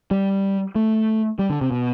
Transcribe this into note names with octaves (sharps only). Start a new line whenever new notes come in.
G3
A3
G3
D3
C3
B2